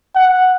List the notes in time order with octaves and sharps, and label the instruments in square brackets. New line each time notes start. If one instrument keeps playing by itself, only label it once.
[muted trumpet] F#5